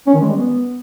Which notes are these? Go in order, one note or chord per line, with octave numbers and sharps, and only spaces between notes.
C#4
D#3
G#3
G3
B3